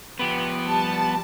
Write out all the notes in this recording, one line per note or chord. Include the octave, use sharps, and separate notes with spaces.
F3 B3 G4 B4
G3 A5